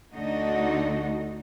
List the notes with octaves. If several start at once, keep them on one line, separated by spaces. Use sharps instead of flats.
D2 D3 A3 D#4 F#4